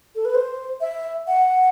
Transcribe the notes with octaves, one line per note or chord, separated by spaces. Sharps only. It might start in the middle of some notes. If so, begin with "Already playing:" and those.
A4
B4
C5
E5
F#5